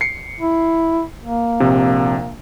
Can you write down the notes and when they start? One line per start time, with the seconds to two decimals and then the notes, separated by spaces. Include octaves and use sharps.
0.01 C7 C#7
0.40 E4
1.23 A#3
1.60 A#1 C3